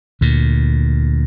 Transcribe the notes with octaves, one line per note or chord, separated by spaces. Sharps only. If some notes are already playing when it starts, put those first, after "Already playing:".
D2 A#2